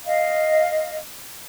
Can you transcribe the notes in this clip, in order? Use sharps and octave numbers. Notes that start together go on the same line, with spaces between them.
D#5 F5